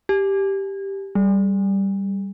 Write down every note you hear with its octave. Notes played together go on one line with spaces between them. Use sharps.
G4
G3